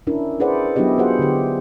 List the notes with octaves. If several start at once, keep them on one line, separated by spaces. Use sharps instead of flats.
C#4 D4 E4 A#4
E4 G#4 B4 C5 D5 F#5
F#3 B3 D4 E4 G4 D#5
F4 G#4 C5 F#5
D3 G4